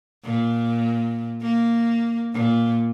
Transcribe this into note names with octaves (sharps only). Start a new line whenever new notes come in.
A#2
A#3
A#2